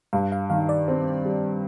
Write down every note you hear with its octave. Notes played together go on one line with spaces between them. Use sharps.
G2 F5
F5
D#3 F5
D5
C4
G3